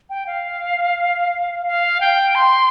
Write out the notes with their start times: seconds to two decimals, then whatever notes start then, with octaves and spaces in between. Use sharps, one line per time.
0.09 G5
0.26 F5
1.66 F5
2.00 G5
2.35 C6